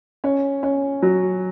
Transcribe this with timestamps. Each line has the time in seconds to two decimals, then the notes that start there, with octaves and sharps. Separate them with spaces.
0.24 C#4
0.63 C#4
1.02 F#3